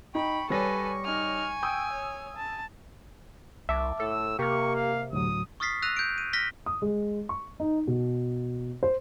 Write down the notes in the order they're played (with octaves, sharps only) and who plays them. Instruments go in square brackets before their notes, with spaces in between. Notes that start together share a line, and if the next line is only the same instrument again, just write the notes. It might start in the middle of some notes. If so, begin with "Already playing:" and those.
[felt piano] D#4 [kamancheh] G5 [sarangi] B5 [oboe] C#6
[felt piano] G3 C#5 A#6 [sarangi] A4 [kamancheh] B4 G#5
[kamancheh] D#4 F6 [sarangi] G#5
[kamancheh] G5 [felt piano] D#6 E6 G6
[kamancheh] C#5
A5
[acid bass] C2 [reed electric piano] E5 A5 D6
[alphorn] A2 [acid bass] A4 [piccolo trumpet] E6
[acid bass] C3 [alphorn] A#3 [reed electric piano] G4 F6 [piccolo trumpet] C#6
[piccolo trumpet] F5
[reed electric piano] D2 A2 F#3 [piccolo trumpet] D#6
[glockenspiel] C#6 D#6 F6 A6 B6 C7
E6 F#6 A#6 D#7 F7
G6 D7
D#7
F6 A#6 B6 G7
[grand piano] D#6
G#3
C#6
D#4
B2
C5